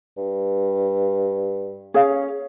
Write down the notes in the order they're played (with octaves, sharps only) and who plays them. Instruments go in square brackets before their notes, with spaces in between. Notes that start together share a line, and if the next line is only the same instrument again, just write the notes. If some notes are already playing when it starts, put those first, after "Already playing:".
[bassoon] G2
[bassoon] C#4 [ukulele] G#4 F5